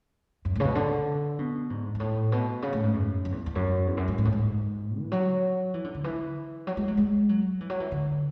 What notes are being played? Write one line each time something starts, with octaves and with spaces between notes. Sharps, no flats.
F#2
A2
C#3
B2
D3
B2
G#2
G#2
A2
B2
C#3
A2
G#2
F#2
F#2
E2
E2
F#2
E2
F#2
G#2
G#2
A2
G#2
E3
F#3
E3
D3
D3
E3
F#3
G#3
F#3
G#3
F#3
E3
F#3
E3
D3